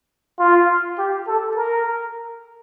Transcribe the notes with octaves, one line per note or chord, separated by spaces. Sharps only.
F4
G4
A4
A#4